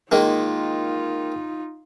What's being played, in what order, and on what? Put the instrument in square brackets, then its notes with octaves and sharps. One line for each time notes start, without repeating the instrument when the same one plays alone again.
[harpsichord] D#3 G#3 A#3 [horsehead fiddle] D#4 F4